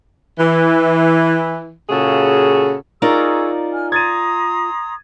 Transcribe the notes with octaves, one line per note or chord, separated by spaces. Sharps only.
E3
A#2 C#3 F#4 G#4 A4
D#4 F4 G#4 A#4 D5 C#6 E6
G#5 F6
A#5 C6 D#6 G#6 A6 D#7